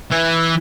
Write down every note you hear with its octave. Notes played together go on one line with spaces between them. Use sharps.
E3